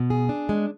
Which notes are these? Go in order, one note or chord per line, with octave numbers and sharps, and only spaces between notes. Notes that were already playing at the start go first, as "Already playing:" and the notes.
Already playing: B2
G#4
D4
G#3